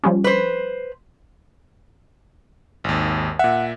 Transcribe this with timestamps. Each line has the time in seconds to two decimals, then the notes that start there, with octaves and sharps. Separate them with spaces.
0.04 F3 G3 C#4
0.24 B4 C5
2.84 G#1 D#2
3.39 A#2 E5 F#5